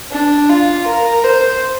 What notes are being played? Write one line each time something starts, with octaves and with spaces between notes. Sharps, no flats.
D4
F4
A#4
C5